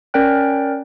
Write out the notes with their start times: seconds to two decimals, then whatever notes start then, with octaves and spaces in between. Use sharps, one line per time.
0.14 C#4 A#4 D5 G5 F#6